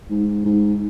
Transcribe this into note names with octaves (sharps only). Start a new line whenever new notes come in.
G#2
G#2